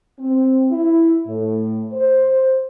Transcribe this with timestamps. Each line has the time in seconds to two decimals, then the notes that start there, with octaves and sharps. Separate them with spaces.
0.18 C4
0.71 E4
1.27 A2
1.92 C5